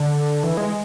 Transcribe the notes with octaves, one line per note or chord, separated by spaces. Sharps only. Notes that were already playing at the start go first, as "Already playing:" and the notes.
Already playing: D3
E3
G#3